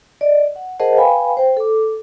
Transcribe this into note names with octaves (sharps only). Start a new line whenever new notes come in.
D5 D#5
F#5
G#4 A#4 C5 D#5 F#5 A5
B4 F5 G5 G#5 B5
C5 G5
A4 D6